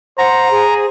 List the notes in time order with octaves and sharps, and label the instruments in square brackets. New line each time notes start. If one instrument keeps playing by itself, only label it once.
[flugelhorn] C5 [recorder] F#5 [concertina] A#5
[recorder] G#4